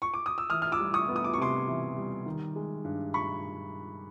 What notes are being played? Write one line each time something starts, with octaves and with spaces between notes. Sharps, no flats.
C#6
D6
D#6
E6
E3 D#6 F6
F6
D6 E6
G3
C#6 D#6
B3
D#6
D6
C#6
C3 C6 D6
E3
G3
D#3
G#3
G2
B5 C#6